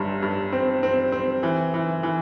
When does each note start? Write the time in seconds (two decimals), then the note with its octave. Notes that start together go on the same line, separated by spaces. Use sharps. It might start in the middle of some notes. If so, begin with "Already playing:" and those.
Already playing: G1 G2
0.23 G2
0.52 C4
0.83 C4
1.12 C4
1.43 E3
1.74 E3
2.03 E3